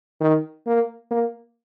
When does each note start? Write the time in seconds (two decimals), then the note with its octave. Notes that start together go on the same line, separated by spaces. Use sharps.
0.21 D#3
0.67 A#3
1.11 A#3